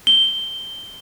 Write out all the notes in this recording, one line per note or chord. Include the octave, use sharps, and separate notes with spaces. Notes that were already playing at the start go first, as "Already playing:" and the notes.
G7